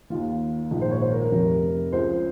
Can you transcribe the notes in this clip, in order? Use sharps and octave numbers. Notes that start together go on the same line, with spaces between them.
D#2 D#3 F4
A#1 G#2 D#3
C5
C#5
C5
A#4
A#4
F1 F2 C3
C#2 C#3 C5